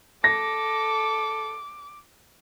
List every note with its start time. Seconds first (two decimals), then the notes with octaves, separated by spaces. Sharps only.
0.24 A4 D6 A#6